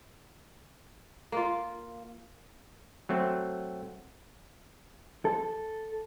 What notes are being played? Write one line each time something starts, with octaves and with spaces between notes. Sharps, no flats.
A#3 F4
F#3 A3 C4
A4